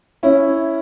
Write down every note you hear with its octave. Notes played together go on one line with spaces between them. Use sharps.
C#4 E4